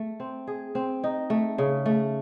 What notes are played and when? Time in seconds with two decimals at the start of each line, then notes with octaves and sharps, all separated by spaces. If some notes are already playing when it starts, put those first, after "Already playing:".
Already playing: A3
0.20 C4
0.47 G#4
0.75 C4
1.04 D#4
1.30 A3
1.58 C#3
1.86 A3